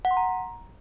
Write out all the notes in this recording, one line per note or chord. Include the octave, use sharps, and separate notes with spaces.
F#5
C6
A#5